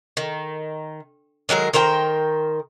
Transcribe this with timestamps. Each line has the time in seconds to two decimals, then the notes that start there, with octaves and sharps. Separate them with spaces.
0.17 D#3
1.49 D#3 F#3 G#3 A#4
1.73 D#3 A#4 C5 G5